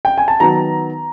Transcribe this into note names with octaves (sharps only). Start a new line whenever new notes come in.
G5
G#5
A5
D#3 F#3 B3 A#5